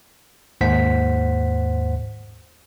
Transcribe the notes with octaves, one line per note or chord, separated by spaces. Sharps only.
D#2 G#2 C5 F#5 B6